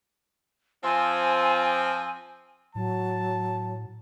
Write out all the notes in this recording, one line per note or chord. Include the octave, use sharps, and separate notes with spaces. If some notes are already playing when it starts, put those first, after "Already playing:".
F3 C4 G#5
A2 F#3 A5